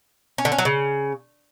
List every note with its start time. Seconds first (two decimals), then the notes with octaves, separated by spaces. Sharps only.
0.38 C#4
0.45 D3
0.52 C#4
0.58 F#3
0.65 C#3